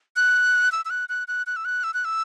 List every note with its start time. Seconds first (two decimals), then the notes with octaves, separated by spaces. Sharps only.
0.16 F#6
0.72 E6
0.85 E6
0.90 F#6
1.09 F#6
1.28 F#6
1.47 F#6
1.56 E6
1.65 F#6
1.84 E6
1.94 F#6
2.05 E6